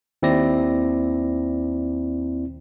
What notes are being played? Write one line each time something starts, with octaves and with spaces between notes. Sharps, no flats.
D#2 C4 E4 D5 A#6